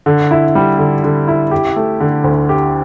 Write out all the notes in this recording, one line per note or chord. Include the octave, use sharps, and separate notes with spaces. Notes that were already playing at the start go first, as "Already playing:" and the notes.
D3
E4
G3
D3
D3
E4
G4
A3
D3
D2
G4